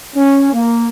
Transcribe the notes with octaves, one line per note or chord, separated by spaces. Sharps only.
C#4
A#3